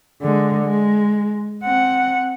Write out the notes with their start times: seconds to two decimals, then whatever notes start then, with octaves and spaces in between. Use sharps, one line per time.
0.22 D3 G#3
0.65 G#3
1.63 C4 F#5